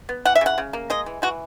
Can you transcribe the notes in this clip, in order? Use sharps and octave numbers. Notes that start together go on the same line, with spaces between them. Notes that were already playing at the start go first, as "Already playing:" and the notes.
B3
E3 F#5
E5
C#3 F#5
C#3
A#3
G#3 D#5
E3
E3 F#4